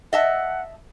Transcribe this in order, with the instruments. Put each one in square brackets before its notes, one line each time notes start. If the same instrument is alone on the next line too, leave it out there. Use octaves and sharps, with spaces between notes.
[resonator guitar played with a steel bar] D#5 E5 A5 [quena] F#5